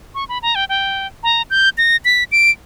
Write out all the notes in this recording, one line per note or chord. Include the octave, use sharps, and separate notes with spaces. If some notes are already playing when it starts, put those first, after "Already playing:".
C#6
B5
A#5
G5
G5
A#5
G6
A#6
B6
D7